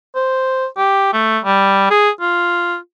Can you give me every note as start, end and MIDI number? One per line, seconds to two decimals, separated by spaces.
0.15 0.66 72
0.77 1.12 67
1.13 1.39 57
1.44 1.88 55
1.90 2.10 68
2.21 2.76 65